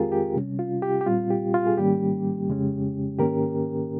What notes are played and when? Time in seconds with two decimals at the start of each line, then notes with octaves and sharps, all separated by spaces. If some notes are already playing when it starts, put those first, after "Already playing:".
Already playing: F2 D#3 G#3 C4 F4 G4 G#4 A#4
0.12 G4
0.35 C3 G3 C#4
0.59 F4
0.82 G4
1.01 G4
1.06 A#2 G3 C4 F4
1.30 G4
1.54 F4
1.66 G#4
1.77 G#2 D#3 G3 A#3 C#4 G4
2.48 F2 C#3 G#3 C#4
3.19 G#2 D#3 A#3 C#4 G4 A#4